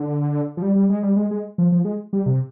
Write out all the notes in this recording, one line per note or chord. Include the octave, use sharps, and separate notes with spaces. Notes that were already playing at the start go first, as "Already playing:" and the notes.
Already playing: D3
F3
G3
G3
G#3
G3
G#3
G#3
F3
F3
G#3
G3
C3